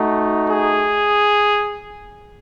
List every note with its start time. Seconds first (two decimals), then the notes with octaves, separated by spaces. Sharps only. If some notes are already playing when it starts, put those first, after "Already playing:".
Already playing: A3 D#4 F#4
0.50 G#4